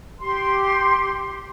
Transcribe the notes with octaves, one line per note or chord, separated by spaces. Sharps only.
G4 C6